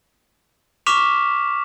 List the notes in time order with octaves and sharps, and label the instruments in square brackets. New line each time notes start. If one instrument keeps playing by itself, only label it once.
[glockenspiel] C#6 D6 F6 B6 E7 F7